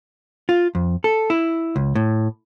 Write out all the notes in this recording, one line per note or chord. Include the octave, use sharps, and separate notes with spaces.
F4
F2
A4
E4
C#2
A2